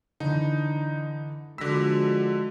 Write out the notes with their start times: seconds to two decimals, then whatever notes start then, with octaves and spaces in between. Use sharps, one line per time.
0.20 D3 E3 D#4
1.58 D3 F3 G#3 F#4 D6 E6 A#6 B6